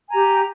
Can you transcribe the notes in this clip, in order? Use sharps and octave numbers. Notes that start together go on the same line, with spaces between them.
G4 G#5 A#5